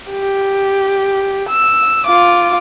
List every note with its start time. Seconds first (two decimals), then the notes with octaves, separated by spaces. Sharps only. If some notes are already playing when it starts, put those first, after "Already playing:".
0.10 G4
1.49 E6
2.07 F4 D6